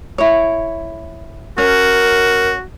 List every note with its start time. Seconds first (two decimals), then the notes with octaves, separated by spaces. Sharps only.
0.18 E4 C#5
1.58 C#4 F#4 A#4